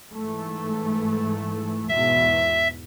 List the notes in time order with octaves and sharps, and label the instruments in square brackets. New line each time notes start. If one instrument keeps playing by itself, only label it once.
[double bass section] G#2 E3 A3
[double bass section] E2 G#2 B2 [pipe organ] E5